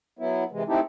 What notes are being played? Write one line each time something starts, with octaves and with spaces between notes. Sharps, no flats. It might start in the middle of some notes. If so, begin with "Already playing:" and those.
F#3 B3 E4
C3 E3 G#3
A3 C4 D#4 E4 G4 A4